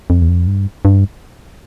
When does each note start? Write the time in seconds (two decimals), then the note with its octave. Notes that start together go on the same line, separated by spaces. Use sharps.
0.10 F2
0.22 E2
0.29 F2
0.47 G2
0.85 G2